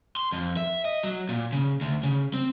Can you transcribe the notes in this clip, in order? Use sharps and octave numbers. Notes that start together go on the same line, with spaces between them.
C6
F2
E5
D#5
F#3
A#2
C#3
D2
C#3
C4